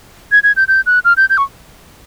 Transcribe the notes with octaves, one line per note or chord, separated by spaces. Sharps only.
G#6
G#6
G6
G6
F#6
F6
G6
G6
C#6